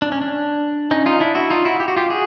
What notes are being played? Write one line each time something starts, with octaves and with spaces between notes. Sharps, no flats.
D4
C#4
D4
C#4 D#4
D#4 F4
D4 E4
E4 F#4
D#4 F4
E4 F#4
G4
F#4
F4 G4
F#4 G#4